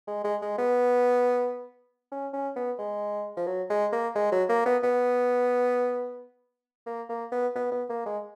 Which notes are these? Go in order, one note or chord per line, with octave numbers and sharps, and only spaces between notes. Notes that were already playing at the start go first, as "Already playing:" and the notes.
G#3
G#3
G#3
B3
C#4
C#4
B3
G#3
F3
F#3
G#3
A#3
G#3
F#3
A#3
B3
B3
A#3
A#3
B3
B3
B3
A#3
G#3